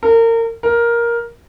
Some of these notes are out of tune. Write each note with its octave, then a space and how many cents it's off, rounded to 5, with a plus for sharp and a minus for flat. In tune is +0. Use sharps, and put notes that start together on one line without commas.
A#4 -30
A#4 +10